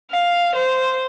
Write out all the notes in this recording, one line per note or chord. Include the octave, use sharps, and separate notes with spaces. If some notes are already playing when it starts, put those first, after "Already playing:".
F5
C5